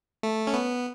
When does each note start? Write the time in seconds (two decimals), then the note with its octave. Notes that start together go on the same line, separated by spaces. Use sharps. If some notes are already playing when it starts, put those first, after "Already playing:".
0.23 A3
0.47 C#4
0.53 B3